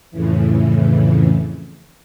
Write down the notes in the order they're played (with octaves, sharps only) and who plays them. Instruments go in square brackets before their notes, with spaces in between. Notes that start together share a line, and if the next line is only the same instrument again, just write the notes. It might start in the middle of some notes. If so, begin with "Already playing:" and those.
[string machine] F2 A2 C#3 E3